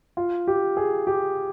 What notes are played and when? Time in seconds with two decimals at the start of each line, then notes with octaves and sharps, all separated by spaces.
0.17 F4
0.48 G4
0.77 G#4
1.07 G4